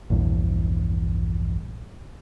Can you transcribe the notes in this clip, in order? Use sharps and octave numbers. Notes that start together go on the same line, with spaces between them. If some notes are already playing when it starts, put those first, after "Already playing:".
A#1 E2 G2